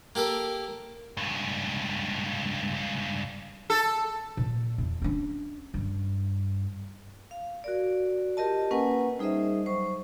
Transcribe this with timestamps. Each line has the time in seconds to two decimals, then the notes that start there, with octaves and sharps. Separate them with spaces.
0.15 A#3 G4 A4 A#4
1.17 C#2 G2
3.70 A4
4.37 A#2
4.78 E2
5.02 C#4 D4
5.74 G2
7.31 F5
7.64 F#4 A#4 D5
8.37 F4 G4 A#4 D#5 A5
8.71 A#3 C#4 A#4 B4 F#5 G#5
9.19 G3 D#4 G#4 C5 D#5 E5
9.66 F#3 C5 C#6